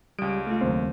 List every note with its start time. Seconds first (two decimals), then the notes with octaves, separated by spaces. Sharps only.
0.19 C#2 G3 D7
0.47 A3 F4
0.61 F#1 D#2 C4